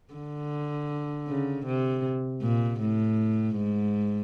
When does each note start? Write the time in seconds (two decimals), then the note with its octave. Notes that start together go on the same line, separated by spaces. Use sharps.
0.14 D3
1.28 C#3
1.66 C3
2.42 A#2
2.80 A2
3.57 G#2